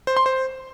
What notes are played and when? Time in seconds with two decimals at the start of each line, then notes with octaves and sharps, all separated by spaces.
0.07 C5
0.17 C6
0.26 C5